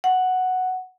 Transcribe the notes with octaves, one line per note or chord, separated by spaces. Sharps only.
F#5